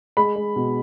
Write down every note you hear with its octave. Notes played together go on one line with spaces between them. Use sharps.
G#3 B5
G#3
B2